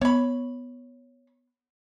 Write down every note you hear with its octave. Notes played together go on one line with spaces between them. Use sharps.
B3 C#5 B5